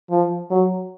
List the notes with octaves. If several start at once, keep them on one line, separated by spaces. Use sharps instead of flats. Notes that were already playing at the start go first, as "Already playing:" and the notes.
F3
F#3